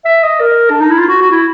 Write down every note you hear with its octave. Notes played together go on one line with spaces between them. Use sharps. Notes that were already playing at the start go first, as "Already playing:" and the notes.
E5
D#5
A#4
D4
D#4
E4
F4
F#4
F#4
E4